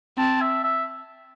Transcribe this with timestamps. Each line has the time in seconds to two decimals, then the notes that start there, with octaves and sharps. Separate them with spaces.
0.18 C4 A5
0.41 E5
0.64 E5